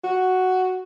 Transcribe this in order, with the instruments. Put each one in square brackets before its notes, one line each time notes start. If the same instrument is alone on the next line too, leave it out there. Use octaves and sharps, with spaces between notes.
[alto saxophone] F#4